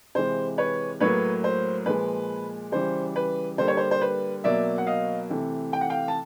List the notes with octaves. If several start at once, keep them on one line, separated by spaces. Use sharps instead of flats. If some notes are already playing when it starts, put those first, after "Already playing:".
C3 E3 G#3 C5
B4 C#5
A2 F#3 A#3 B4 C#5
C5
A#2 F3 G#3 B4
C#3 E3 G3 C5
B4
D3 G3 A#3 C5
C#5
C5
C5
B4
B2 F#3 A#3 D5 E5
F#5
D#5 F5
C3 E3 A3
G5
F#5
F5 G5
A5